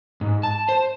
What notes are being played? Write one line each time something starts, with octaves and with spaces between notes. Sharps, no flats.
G#2
A5
C5